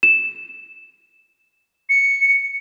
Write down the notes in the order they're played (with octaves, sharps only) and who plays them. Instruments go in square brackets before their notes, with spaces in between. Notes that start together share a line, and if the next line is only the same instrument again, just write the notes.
[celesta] E7
[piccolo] C#7